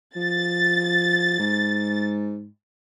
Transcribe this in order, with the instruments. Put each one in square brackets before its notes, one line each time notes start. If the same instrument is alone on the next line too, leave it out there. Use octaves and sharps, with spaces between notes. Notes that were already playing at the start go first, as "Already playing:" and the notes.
[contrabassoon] F3 [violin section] A6
[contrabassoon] G#2